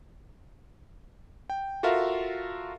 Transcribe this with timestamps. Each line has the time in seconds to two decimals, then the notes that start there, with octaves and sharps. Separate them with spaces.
1.50 G5
1.83 F4 F#4 A4 A#4 E5 F5